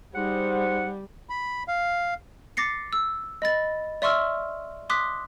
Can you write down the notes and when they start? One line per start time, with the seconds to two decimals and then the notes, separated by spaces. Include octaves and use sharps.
0.15 G3 D#4 G#4 C5 F#5
1.29 B5
1.68 F5
2.57 D6 A6 A#6 C7 C#7
2.93 E6
3.42 D#5 B5 A6
4.02 D5 E5 C6 C#6 E6 F6
4.90 C6 D6 D#6 F#6 B6